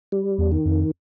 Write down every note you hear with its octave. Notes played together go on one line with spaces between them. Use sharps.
G3
E2
D#3
F2